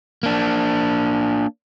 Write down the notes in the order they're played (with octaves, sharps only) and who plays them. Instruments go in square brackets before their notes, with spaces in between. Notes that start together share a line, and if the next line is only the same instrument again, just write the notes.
[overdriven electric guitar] A#3 D4